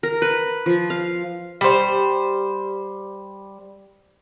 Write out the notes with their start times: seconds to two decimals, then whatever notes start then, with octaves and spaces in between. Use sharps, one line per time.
0.03 A#4
0.22 B4
0.66 F3
0.90 F5
1.61 G3 C5